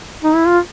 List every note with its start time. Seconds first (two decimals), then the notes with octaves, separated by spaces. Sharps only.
0.23 D#4
0.36 E4
0.47 F4